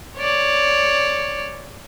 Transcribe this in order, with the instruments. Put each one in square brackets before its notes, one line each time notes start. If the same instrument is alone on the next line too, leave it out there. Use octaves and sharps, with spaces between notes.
[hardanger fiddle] C#5 D5